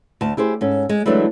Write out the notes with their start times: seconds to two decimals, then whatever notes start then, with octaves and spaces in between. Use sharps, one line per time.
0.21 D2 A5
0.37 E4 G4 G#4 C5
0.61 G#2 C#4 A4
0.89 G#3
1.06 E3 F#3 G#3 A3 D4